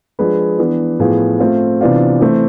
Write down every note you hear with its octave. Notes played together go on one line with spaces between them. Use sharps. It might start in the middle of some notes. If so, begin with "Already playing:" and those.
F3 G#3 D4 G#4 B4
E3 B3 D4
A2 F3 B3 F4 G#4
A3 C4 F4
C3 E3 B3 D4 F4
E3 A3 C4